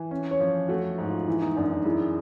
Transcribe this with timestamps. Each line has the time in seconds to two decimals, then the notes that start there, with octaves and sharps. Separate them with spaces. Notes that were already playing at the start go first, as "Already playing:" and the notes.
Already playing: E3
0.11 C#4
0.31 C#5
0.40 F3
0.69 A3 F#4
0.98 G#2
1.09 F4
1.27 E3 E4
1.41 D#4
1.56 F#2 D4
1.71 D#4
1.85 G#3 E4